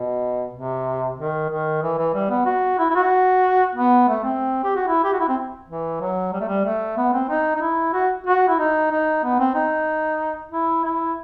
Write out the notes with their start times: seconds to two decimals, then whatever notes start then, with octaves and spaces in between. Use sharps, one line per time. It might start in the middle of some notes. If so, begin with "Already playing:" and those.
Already playing: B2
0.53 C3
1.18 D#3
1.50 D#3
1.82 E3
1.98 E3
2.14 G3
2.30 B3
2.46 F#4
2.79 E4
2.90 E4
2.95 F#4
3.75 B3
4.08 A3
4.24 C4
4.64 G4
4.76 F#4
4.88 E4
5.04 G4
5.13 F#4
5.20 E4
5.29 C4
5.69 E3
6.01 F#3
6.33 G3
6.40 A3
6.48 G3
6.65 A3
6.97 B3
7.14 C4
7.29 D#4
7.56 D#4
7.61 E4
7.94 F#4
8.27 F#4
8.49 E4
8.59 D#4
8.91 D#4
9.24 B3
9.39 C4
9.55 D#4
10.52 E4
10.84 E4